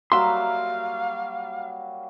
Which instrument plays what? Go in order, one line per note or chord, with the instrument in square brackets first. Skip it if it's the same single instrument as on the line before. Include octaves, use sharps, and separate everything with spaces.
[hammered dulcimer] F#3 G3 A#3 [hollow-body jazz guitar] E5 C6 [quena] F5